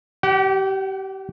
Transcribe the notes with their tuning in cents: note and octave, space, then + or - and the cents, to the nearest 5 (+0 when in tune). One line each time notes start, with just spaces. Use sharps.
G4 -25 F#5 +30